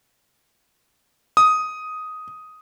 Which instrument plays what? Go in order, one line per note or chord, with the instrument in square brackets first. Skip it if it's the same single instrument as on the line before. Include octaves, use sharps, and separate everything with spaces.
[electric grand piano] D#6